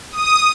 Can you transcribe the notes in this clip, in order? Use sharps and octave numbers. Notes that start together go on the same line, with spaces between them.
D#6